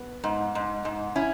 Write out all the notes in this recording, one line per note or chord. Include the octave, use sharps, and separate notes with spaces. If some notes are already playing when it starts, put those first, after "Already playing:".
Already playing: B3
G#2
G#2
G#2
C#4 E4